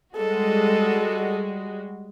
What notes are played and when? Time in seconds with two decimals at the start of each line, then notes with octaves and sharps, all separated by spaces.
0.16 G3 G#3 F#4 A4